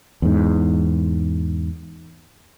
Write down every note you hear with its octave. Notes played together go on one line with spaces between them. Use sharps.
E2 G#2